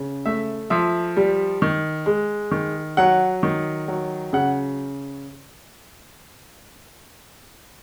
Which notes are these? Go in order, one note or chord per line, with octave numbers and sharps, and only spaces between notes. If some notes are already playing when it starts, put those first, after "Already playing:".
Already playing: C#3
A3 E5
F3 E5
G3
D#3
G#3
D#3
F#3 F#5
D#3
F#3
C#3 F#5